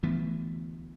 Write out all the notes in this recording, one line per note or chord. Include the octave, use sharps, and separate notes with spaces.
D2 E3 A3 B3